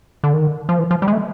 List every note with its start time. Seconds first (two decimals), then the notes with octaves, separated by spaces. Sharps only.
0.24 D3
0.34 D#3
0.69 F3
0.79 E3
0.91 F3
1.02 G3
1.08 G#3
1.13 A3